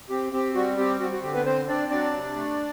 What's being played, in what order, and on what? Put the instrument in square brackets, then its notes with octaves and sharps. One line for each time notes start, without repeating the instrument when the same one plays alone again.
[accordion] C4 G4
C4 G4
G3 F#4
C4 G4
C4 F#4
F#4
D3 G4
B3 B4
C4 C5
C4 D4 D5
F#3 D4 D5
C3
A3